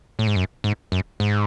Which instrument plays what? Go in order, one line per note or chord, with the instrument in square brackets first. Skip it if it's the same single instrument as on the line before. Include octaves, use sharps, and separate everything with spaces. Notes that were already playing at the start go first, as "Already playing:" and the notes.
[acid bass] A2
G#2
F#2
G#2
F#2
G#2